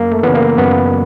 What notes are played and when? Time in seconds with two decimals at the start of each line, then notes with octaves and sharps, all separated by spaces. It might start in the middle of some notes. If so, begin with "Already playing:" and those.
Already playing: F#2 A#3
0.12 A3
0.23 C#3 E3 B3
0.35 A#3
0.58 F#2 B3